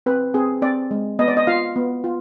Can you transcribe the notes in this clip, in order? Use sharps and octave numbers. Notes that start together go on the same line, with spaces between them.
C4 B4
C4 G#4
C4 D5
G#3
B3 D#5
D5
D#5
F4 F5
B3
F4